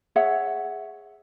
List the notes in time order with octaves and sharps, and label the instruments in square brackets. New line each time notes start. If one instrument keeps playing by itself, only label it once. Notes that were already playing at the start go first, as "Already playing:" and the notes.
[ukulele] G#4 C#5 E5 F#5